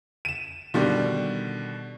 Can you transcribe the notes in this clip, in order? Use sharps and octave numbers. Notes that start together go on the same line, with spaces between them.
D#7 E7
B2 D3 D#3 G3 D4